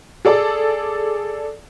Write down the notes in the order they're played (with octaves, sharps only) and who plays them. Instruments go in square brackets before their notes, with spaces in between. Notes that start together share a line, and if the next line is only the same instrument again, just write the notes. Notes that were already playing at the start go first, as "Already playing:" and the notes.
[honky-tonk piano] G#4 A4 D5